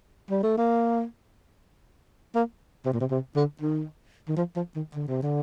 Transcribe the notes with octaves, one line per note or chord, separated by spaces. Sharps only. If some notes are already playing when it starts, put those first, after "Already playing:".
G3
A3
A#3
A#3
C3
A#2
C3
C3
D3
D#3
D#3
F3
F3
D#3
D3
C3
D3